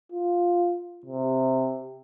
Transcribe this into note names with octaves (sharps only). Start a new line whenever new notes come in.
F4
C3